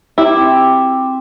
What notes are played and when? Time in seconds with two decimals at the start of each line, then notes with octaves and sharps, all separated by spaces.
0.18 E4 G4
0.36 C4